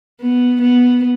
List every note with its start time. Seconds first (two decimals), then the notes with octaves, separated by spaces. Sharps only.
0.21 B3
0.61 B3